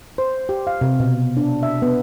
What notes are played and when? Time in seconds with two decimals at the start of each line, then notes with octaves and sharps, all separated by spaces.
0.18 C5
0.49 G4
0.67 F5
0.81 C3
1.00 B2
1.37 D4
1.63 E5
1.82 B3